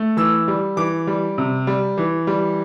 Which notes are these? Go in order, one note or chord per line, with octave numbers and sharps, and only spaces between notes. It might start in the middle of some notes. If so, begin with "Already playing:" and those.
Already playing: A3
E3 E6
G3
E3 D6
G3
C3
G3
E3
G3